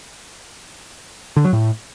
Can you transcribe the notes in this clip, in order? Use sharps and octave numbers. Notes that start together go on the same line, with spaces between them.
D3
F#3
A2